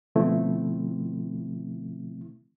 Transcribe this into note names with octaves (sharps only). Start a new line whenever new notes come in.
B2 D3 F3 A3 C4 E4